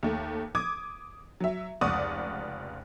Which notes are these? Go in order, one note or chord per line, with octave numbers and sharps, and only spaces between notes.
D#2 A3
D6 D#6 G#6
F#3 E5
F1 C#2 D5 F#5 C#6 D#6